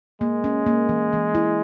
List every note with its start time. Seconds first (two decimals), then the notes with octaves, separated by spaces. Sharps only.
0.21 G#3 A#3
0.44 C#4
0.66 A#3
0.89 E3
1.13 E3
1.35 E4